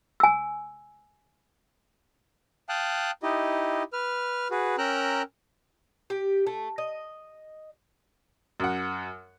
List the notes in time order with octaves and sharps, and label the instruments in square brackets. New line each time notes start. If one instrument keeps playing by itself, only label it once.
[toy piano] G#5 E6
[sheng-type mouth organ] F5 G5 A5 D#6 F#6
D#4 E4 G4 D#5
B4 F6
F#4 G#4 B4
C#4 A#4 G5 A#5 E6 F#6
[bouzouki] G4
A3
D#5
[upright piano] F#2 F#5